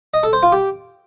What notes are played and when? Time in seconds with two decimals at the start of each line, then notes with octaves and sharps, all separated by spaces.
0.14 D#5
0.23 A4
0.33 C5
0.43 F4
0.52 G4